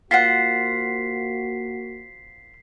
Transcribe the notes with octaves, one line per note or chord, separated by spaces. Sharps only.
A#3 F4 F#4 C5 F#5 B6 C7